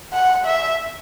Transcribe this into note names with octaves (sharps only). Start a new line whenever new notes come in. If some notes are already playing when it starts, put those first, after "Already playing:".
F#5
E5